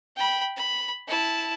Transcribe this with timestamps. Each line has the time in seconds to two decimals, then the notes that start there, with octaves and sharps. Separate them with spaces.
0.16 G5 B5
0.57 B5
1.08 E4 A5